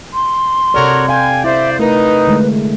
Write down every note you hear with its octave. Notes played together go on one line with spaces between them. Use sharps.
C6
C3 F#4 A4 A#4 C#5 D5
F5 G5 G#5
E4 C5 D5 E5
A3 D#4 A#4 B4
D3 G#3 A3